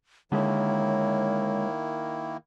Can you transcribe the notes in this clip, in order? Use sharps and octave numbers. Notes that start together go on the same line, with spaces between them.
D3 D#3 G#3 A#3 E4 C#5